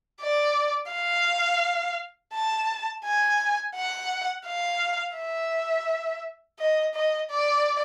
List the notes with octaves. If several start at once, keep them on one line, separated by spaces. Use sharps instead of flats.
D5
F5
A5
G#5
F#5
F5
E5
D#5
D#5
D5